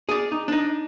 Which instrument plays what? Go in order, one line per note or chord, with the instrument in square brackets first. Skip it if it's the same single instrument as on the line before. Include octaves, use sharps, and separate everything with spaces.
[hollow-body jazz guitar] G#4 D5
D#4
D4 D#4